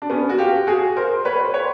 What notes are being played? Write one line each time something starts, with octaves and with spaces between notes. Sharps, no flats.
D4
B3 C#4
F#4
F4 G4
F#4 G#4
A#4 C5
B4 C#5
C5
B4 C#5